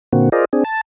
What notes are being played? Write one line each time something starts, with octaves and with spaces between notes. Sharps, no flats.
A#2 D3 A#3 C4 F#4
F4 G#4 A#4 C5 D5 D#5
C4 D4 G#4
A5